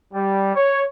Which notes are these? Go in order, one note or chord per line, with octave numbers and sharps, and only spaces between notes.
G3
C#5